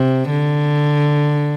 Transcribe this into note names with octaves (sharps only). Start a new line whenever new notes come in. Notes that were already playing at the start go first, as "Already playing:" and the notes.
Already playing: C3
D3